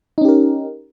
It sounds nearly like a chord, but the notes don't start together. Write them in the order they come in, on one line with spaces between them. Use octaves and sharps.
D#4 C#4 G4 A#4